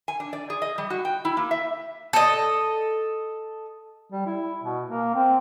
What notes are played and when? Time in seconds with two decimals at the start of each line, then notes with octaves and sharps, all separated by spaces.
0.08 G#5
0.20 D4
0.33 D5
0.50 G#4
0.62 D#5
0.78 G3
0.90 F#4
1.05 G5
1.25 E4
1.37 A#3
1.51 E5
2.13 A4 D#5
4.12 G3
4.26 E4
4.63 B2
4.87 A#3
5.15 C4